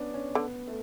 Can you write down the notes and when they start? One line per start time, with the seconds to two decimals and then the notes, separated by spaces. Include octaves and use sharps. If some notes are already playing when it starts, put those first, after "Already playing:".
Already playing: B3 C#4 D4
0.14 C#4
0.35 D3 B3
0.68 A3